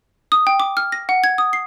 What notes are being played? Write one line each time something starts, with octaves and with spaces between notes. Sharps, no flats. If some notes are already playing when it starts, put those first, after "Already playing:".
D#6
G5
D6
F6
A#6
F#5
G#6
D#6
C7